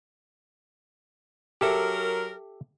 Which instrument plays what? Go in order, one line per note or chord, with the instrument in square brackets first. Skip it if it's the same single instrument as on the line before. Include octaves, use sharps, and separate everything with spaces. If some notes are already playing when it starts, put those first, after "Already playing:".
[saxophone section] F#3 A#4 [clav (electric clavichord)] G4 A4 E5